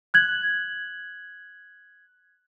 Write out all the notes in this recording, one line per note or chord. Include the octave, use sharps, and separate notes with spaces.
F#6 G#6 F#7